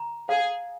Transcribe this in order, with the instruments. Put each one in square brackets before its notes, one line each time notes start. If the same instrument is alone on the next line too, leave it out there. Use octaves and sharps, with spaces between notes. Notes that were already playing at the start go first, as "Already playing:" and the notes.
Already playing: [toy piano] A#5
[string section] G#4 [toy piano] F5